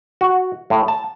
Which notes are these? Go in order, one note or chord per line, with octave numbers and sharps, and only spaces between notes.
F#4
A2
A5